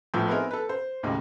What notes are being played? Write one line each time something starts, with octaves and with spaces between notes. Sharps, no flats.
A#1 A2 F3 B3 E6 G6
B3 C4 D#4 E4 G#4 A#4
A4 B4
C5
D#2 A2 C#3 G#3